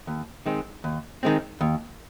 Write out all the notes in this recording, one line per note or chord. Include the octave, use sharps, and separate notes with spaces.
D#2
D#3 G#3 C4
D#2
D#3 G#3 C4
D#2